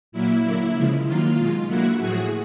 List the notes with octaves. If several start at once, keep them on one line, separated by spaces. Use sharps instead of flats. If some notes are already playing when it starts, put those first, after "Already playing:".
A#2 F#3 A#3 E4
D3 F#3 A#3
C#3 F3 G#3
D#3 F#3 A#3 F4
B2 G#3
D3 F#3 A#3 E4 F#4
A2 F3 A3 F#4 G#4